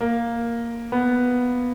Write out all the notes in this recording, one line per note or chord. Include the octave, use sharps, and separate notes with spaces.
A#3
B3